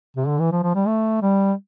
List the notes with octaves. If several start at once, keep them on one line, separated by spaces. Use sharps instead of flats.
C3
D3
E3
F3
F3
G3
A3
G3